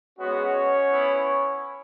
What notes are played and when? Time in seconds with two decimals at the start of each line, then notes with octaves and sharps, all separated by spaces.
0.18 G#3 B3 C#4 F#4 C#5
0.89 B3 E4